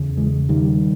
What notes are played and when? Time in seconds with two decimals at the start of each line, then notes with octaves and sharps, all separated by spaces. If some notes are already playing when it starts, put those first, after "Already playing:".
Already playing: E2 C#3
0.17 E3 G#3
0.49 D#3 G3